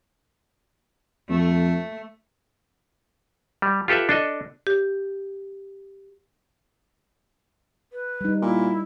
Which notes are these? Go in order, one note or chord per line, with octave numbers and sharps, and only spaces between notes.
F2 A3
G3
F4 G4 A4 B4 E5
D4 A4 D#5
G4
B4
G3 D#4
A#2 E4